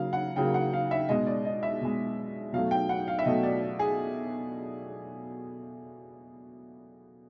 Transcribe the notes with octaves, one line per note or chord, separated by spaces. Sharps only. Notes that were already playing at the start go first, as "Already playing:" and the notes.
Already playing: C#3 F#3 A#3 F5
F#5
C#3 F#3 A#3 G5
F#5
F5
E5
B2 G#3 D#5
D5
D#5
E5
B2 G#3
B2 F#3 A3 F5
G5
F#5
F5
E5
B2 F#3 A3 D#5
D5
G#4